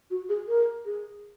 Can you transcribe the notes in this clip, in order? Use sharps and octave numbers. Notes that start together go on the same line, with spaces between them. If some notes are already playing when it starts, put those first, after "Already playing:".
F#4
G#4
A#4
G#4